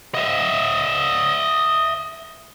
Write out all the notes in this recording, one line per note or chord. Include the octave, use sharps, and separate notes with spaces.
D#5 E5